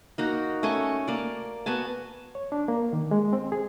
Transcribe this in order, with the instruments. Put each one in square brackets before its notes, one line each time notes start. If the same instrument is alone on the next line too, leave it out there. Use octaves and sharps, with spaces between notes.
[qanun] A#3 D#4 F#4
A3 C#4 G#5 C#6
A#3 D5
B3 F#4 G#5 A5
[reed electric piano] C#5
D4
A#3
D#3
G#3
C4
G#4